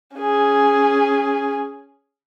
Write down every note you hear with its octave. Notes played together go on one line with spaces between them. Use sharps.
C#4 G#4